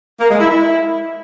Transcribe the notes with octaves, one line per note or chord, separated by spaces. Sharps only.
A#3
G#3
E4
E4